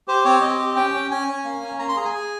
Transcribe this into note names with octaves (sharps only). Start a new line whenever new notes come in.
G4 C5
C4 C#5
C4 D#5
G4
C#4 G5
C#4
C#4 G#5
C#4
A#3
C#4
A#3 A#5
C6
G#4 A#5
G#5
G#4